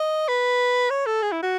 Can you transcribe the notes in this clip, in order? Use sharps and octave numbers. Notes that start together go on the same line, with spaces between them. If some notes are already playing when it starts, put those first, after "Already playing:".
Already playing: D#5
B4
C#5
A4
G#4
E4
F#4